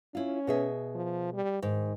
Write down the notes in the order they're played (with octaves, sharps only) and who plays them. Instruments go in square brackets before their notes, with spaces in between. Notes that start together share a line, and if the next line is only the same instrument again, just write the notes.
[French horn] C#4 [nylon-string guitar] E4 F4
[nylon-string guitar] B2 G#4 E5
[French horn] F3
G3
[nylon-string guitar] G#2 [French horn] D#3